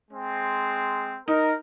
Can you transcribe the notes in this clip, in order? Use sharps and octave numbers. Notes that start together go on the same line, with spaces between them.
G#3 C4
D#4 A#4